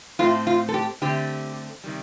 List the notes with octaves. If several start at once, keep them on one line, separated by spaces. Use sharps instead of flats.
A2 A3 C4 F4
F4
A4
G4
D3 A3 C4 G4
C3 D#3 G3